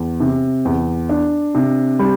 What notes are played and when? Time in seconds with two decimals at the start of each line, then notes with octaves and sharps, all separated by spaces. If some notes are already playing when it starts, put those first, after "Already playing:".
Already playing: E2
0.20 C3
0.65 E2
1.09 D4
1.55 C3
1.99 G3